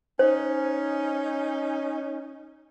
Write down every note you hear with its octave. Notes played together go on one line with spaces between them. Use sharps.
C#4 D#4 C5